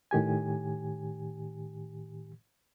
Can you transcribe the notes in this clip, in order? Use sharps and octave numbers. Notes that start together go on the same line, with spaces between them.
A2 D#3 G4 G#5